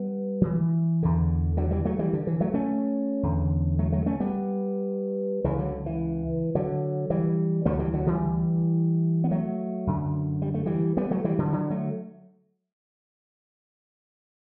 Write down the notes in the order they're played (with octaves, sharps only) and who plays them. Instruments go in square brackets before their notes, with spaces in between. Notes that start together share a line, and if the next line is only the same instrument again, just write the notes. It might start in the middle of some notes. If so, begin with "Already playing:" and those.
Already playing: [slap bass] G3 B3
F#3
E3
E2 D3
D3 F#3
E3 G3
F#3 A3
E3 G3
D3
E3
F#3 A3
A3 C#4
E2 D3
F#3 A3
F#3 A3
A3 C#4
G3 B3
C#2 C#3 E3
D3 F#3
E3
D3 F#3
E3 G3
D2 D3 F#3 A3
E3 G3
D3 F#3
E3 G3
B3
F#3 A3
F#2 D3
G3
A3
E3 G3
G3 B3
F#3 A3
E3 G3
D3 F#3
D3 F#3
F#3 A3